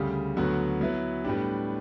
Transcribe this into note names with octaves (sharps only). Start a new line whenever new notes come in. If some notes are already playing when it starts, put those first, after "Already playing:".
Already playing: D2 C#3 G3
D2 D3 F#3 B3 F#4
F#3 B3 E4 B4
A2 G3 B3 D4 G4